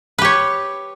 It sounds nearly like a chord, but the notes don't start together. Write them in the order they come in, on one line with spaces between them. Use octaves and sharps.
B4 G4 C#5